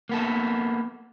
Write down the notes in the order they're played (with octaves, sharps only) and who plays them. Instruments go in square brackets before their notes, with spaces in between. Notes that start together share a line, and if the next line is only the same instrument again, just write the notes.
[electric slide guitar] A#3 B3 A4